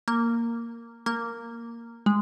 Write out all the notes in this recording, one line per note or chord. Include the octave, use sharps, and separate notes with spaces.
A#3
A#3
G#3